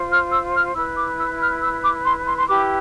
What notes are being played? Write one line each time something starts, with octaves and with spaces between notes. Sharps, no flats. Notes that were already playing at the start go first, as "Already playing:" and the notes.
Already playing: F4 C5
F6
E6
F6
E4 B4 E6
D6
E6
F6
E6
D6
C6
C6
C6
E4 G4 B4 D6